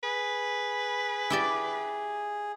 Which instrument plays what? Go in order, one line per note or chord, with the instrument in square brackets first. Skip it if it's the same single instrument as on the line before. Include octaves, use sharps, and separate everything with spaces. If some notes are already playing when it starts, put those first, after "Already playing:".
[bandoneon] G#4 [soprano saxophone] B4
[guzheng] E4 G4 D5